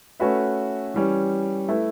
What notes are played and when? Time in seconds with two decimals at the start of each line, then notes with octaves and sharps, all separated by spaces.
0.20 A3 C#4 F#4 B4 E5
0.94 E3 G3 C#4
1.68 A3 E4 B4 E5